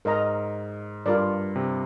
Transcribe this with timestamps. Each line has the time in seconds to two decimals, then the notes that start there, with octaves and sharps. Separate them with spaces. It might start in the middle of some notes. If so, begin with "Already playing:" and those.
0.05 G#2 A#4 D#5 A#5
1.06 G2 F4 A#4 D5
1.56 C3